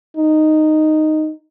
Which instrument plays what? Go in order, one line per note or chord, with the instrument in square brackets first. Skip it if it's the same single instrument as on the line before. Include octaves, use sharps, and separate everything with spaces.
[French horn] D#4